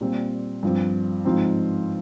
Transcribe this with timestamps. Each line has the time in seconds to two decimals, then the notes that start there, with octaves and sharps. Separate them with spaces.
0.01 A#2 G3 C4
0.63 G2 F3 C4
1.25 G#2 F3 C4 D#4